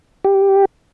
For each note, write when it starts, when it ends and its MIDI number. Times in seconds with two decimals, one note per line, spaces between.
0.24 0.65 67